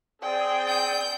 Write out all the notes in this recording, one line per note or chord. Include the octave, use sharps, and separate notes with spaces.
C4 G#4 D5 G5
G6